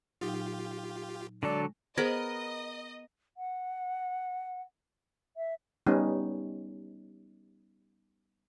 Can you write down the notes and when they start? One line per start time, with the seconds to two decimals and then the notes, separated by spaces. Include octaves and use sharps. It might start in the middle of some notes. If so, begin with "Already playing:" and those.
0.21 A#2 F#3 D#4 F4 G4
1.43 D3 F#3 G#3 A4 D5
1.98 B3 G#4 A#4 C5 D#5 B5
3.37 F#5
5.37 E5
5.86 G3 B3 C#4 D#4